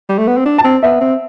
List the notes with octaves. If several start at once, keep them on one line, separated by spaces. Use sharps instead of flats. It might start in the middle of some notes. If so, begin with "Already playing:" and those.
G3
A3
B3
C4
D4
A5
C4
B3 E5
C4